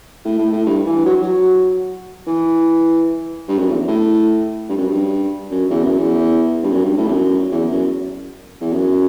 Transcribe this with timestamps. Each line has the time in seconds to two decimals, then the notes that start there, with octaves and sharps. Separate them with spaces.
0.25 A2
0.39 A2
0.52 A2
0.66 G2
0.86 E3
1.05 F#3
1.22 F#3
2.27 E3
3.48 G2
3.58 F#2
3.69 E2
3.88 A2
4.69 G2
4.77 F#2
4.87 G2
5.50 F#2
5.70 E2
5.83 F#2
5.98 E2
6.63 G2
6.71 F#2
6.84 G2
6.97 A2
7.07 E2
7.11 F#2
7.51 E2
7.71 F#2
8.61 E2
8.73 F#2